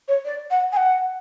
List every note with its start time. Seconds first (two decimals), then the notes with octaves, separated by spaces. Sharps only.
0.08 C#5
0.25 D5
0.51 F#5
0.72 G#5
0.77 F#5